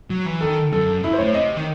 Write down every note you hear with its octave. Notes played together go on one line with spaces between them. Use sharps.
F#3
E3
D#3 A4
F#2 A4
F#2 E4
C5
A2 C#5
C3 D#5
D#3